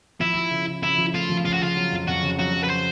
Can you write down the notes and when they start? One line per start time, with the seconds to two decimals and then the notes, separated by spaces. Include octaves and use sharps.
0.20 F3 E4
0.36 F3
0.51 C#3
0.68 C#3
0.82 C#3 E4
0.98 F3
1.14 A3 F4
1.30 F3
1.45 C#3 F4
1.54 F#4
1.61 C#3 F4
1.77 F#3
1.92 F2
2.07 F2 F#4
2.23 C#3
2.39 F#3 F#4
2.54 F#3
2.64 B4
2.70 C5